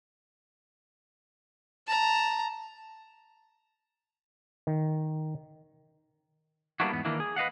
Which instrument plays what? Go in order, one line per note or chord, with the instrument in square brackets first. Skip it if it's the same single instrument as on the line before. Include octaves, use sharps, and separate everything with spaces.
[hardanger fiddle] A5 A#5
[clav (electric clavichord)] D#3
[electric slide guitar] G3 A#3 B3 D4 E4 F#4
E2 G#2 B3
D#3 E3 A#3 D4 E4
G#4
B4 D#5 F5 F#5